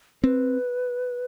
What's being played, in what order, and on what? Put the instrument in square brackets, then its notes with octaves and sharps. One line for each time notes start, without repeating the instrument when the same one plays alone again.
[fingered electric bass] C4 [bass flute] B4